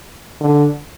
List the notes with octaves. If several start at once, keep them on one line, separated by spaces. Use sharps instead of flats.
D3